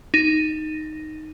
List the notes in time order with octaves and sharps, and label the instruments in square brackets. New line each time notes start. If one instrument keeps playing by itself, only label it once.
[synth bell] D#4